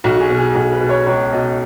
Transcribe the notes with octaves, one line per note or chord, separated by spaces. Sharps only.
B1 F#4
F#4
G#4
B2
G#4
B1 G#4
B4
B2
C#5
C#2 C#5
B2 D#5